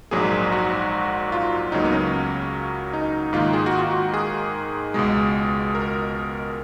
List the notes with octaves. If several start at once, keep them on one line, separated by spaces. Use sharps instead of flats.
A#1 G#2 F#3 A#3 G#4
F#4
F4
C#2 C#3 F#3 A#3 D#4
B3
C#4
D#4
G#2 D#3 A#3 F4
G#4
F#4
F4
F#4
G#4
C#2 B2 G#3
A#4